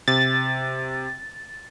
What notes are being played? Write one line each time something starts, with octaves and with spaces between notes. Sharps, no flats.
C3 A6